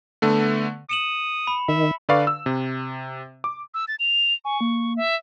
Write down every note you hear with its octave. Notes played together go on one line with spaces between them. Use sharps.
D3 A3 B3
D#6 C#7 E7 F#7
B5
D#3 E5
D3 B4 D5 F5 C#6
E6
C3
D6
E6
A6
F7
G#5 C#6
A#3
E5